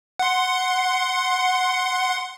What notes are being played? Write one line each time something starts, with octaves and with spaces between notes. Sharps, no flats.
F#5 C6